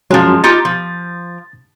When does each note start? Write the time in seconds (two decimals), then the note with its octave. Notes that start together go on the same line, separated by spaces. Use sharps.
0.11 F3 F#3 G#3 C#4
0.44 D#4 F4 G4 A6
0.65 F3